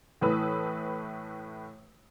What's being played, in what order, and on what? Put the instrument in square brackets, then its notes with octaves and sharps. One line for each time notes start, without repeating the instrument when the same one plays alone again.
[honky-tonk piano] A2 E3 A3 B4 D#6 E6